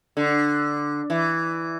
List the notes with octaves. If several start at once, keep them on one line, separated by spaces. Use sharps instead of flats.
D3
E3